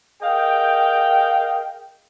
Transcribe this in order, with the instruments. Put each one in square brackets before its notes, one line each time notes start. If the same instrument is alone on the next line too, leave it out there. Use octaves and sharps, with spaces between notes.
[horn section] G#4 A#4 D#5 F5 G5